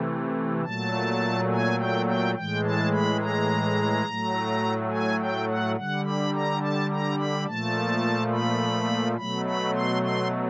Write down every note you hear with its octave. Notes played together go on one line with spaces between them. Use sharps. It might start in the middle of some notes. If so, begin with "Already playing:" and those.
Already playing: C3 E3 A3
A#2 F#3 A3 A5
G#5
G5
G5
A2 E3 G#3 G5
A5
B5
A#5
A2 F#3 A3
G#5
G5
F#5
D3 G3 F#5
B5
A#5
A5
A#5
B5
A#2 F3 A3 A5
B5
B2 F#3 A3 B5
B5
C6
C6